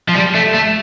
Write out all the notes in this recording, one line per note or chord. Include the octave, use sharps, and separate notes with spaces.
F3
G3
A3
A3